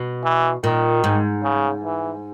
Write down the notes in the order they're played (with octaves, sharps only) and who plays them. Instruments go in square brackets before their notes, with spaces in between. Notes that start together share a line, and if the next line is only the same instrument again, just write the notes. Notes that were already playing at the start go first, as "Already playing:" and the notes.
Already playing: [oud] B2
[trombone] E3
[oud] A#2 [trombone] D#3
[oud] G#2
[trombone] C#3
E3